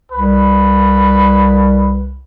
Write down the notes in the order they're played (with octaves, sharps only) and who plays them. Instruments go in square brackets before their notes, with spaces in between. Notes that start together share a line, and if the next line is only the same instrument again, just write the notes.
[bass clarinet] C2 [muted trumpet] B4